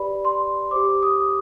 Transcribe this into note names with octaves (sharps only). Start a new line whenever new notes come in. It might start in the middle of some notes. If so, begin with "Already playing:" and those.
Already playing: G4 B4 D5 B5
C6
G4 C5 D6
D#6